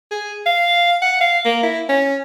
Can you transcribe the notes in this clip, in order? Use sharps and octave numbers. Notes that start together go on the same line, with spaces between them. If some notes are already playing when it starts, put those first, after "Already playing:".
G#4
F5
F#5
F5
A#3
E4
C#4